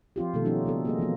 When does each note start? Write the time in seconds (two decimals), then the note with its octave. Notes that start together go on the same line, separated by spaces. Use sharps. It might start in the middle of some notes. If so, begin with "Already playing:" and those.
0.16 F3 C4 F4 G4
0.34 B2 D#3 A3 A4
0.45 F3 G3 C#4 D#4 F#4
0.65 C#3 A#3 C4 A4
0.85 A#3 G#4 D#5
0.99 E3 F3 A#3 B3